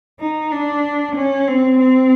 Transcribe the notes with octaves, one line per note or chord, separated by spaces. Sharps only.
D#4
D4
C#4
C4
C4